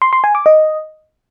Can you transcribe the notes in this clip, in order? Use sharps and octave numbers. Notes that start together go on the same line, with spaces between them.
C6
C6
G#5
D6
D#5